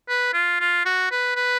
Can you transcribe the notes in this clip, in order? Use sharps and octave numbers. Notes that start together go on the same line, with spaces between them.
B4
F4
F4
F#4
B4
B4